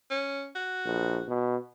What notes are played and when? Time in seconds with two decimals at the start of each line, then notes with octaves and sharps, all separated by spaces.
0.11 C#4
0.55 F#4
0.85 A#1
1.28 B2